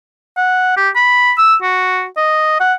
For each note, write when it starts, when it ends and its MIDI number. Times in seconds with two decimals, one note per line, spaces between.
0.37 0.76 78
0.77 0.89 67
0.95 1.33 83
1.38 1.55 88
1.62 2.05 66
2.17 2.58 75
2.60 2.73 78